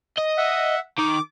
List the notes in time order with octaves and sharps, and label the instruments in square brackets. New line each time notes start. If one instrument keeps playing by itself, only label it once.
[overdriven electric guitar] D#5
[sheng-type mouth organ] E5 F#5
[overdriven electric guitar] D#3 [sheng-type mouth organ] D6